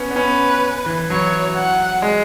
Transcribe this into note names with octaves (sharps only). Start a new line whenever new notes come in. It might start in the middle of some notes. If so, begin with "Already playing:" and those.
Already playing: B3 C#4
B3
C#4 B4
E3
F#3 C#5
F#5
G#3